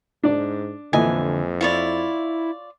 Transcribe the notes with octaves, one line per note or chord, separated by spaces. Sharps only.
G#2 D4 D5
F2 A#2 D3 E3 D#5 G#5
E4 F4 C#5 D5